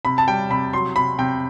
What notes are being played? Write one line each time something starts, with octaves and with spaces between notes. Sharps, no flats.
C3 B5
A5
G3 G5
C3 B5
F#3 C6
C3 B5
C3 G5